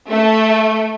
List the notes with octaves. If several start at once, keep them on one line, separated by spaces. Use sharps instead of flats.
A3